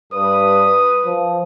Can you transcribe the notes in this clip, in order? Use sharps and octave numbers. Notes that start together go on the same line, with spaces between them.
G2 B4 D#6
F3